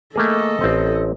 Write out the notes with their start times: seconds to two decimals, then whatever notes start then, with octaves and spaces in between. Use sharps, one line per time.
0.16 A3 A#3 G#4 A4 D#5
0.61 A1 C4